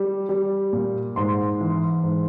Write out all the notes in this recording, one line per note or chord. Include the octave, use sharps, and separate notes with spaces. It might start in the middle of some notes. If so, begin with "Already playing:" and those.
Already playing: G3
G3
A#2
G#2 C6
E3
G#2